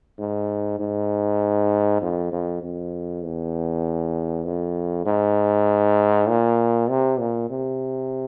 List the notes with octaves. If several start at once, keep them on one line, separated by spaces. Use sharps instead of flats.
G#2
G#2
F2
F2
F2
E2
F2
G#2
A#2
C3
A#2
C3